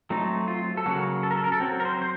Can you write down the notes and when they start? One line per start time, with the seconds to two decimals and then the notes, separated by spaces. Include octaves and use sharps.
0.10 F#3 A3 C4 D#4
0.48 F4
0.77 A4
0.86 C#3 F#3 A#3 F#4
1.23 A4
1.31 A#4
1.37 A4
1.44 A#4
1.52 A4
1.60 F#3 C4
1.80 A#4
1.85 C5
2.02 C5